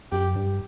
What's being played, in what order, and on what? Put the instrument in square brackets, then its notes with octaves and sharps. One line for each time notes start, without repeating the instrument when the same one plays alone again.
[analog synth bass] F#2 [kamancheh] G4
[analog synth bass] G2